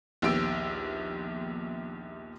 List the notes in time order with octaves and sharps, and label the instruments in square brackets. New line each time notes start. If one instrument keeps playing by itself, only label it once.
[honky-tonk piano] A#1 D#2 B3 G4 E6 D7